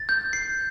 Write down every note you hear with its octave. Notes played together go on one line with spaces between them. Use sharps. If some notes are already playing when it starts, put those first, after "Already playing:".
Already playing: A6
G6
C7